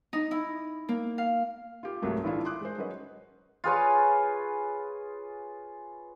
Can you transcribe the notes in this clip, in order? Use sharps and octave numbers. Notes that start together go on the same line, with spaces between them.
D#4
E4
A#3
F5
F4 G4
C2 G#2 F#3 A3 A#3
A2 E3 A3 D4 E4 F4
C6 D6 D#6 F#6
G#3 C5
F#3 C#4 F#4 B4 D#5
F4 G#4 B4 C#5